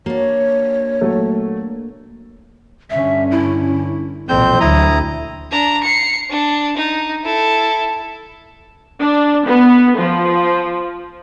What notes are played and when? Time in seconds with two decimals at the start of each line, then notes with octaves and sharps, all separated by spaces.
0.06 A#3 D4 F#4 C#5
1.01 A#2 F#3 A3
2.90 G2 D3 C#4 E5
3.31 E4
4.29 B1 F2 A#2 E3 C4 C5 G6
4.60 D2 F#3 E4 A#5 D#6
5.51 D4 A#5
5.83 C7 C#7
6.30 D4
6.77 D#4
7.24 E4 A4
9.00 D4
9.46 B3
9.97 F3